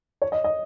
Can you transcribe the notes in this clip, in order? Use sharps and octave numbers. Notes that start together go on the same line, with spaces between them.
C#5
D#5
D#5